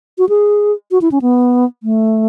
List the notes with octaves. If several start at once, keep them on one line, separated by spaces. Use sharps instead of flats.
F#4
G#4
F#4
E4
C#4
B3
A3